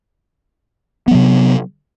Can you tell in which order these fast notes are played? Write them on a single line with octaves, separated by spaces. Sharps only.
B3 F#3 C3